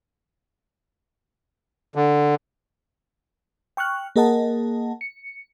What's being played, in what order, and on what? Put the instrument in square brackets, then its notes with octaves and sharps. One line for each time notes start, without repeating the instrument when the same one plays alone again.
[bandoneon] D3
[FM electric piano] G5 C#6 F6 F#6
A#3 G#4 A#4 D#5 F#5 A5
C#7